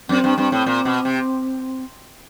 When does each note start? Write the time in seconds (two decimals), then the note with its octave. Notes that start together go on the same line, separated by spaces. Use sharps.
0.09 F#2 C4
0.24 G2
0.38 G2 C4
0.52 A2
0.66 A#2
0.85 B2
1.05 C3